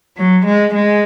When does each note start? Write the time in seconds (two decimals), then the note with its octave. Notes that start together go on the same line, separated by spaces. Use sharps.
0.17 F#3
0.46 G#3
0.74 G#3